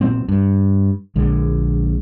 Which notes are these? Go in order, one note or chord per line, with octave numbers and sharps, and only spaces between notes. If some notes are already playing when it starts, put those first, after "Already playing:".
A#2 F#3 B3 C4
G2
A#1 D3 G#3